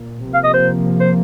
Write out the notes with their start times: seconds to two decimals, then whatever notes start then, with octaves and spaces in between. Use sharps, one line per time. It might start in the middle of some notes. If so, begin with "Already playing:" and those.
Already playing: A#2
0.25 C3 F3 A#3
0.34 F5
0.44 D#5
0.54 C5
1.00 C5